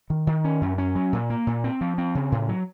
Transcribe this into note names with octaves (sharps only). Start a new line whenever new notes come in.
D#3
D#3
C#4
F#2
C#4
F#3
A#2
A#3
A#2
C4
F3
C4
C#3
A2
F#3